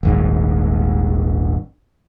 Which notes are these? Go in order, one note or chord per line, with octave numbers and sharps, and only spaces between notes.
D#1 G#1 G#2